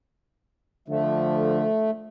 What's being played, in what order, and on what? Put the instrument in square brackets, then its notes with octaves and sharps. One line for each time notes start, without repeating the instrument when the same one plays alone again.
[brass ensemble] D3 F3 [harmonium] A3